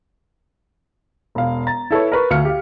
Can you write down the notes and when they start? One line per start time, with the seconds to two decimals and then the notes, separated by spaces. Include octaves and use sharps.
1.35 E1 F5
1.67 A#5 A6
1.91 E4 A4 B4 C#5
2.12 A#4 B4 C#6
2.30 D2 F5 F6 C#7
2.45 G4 F5